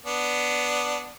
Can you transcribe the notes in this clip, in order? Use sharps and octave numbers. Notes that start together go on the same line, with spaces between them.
B3 D4